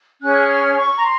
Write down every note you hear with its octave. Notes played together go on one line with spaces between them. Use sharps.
C#4 G#4 C#5 F#6
F6
C#6
A#5
C6